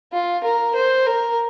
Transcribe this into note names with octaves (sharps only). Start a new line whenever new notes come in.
F4
A#4
C5
A#4